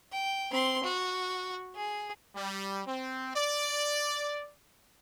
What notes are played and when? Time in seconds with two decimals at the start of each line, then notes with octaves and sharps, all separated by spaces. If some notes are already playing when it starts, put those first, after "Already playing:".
0.12 G5
0.52 C4 C6
0.84 F#4
1.75 G#4
2.35 G3
2.86 C4
3.35 D5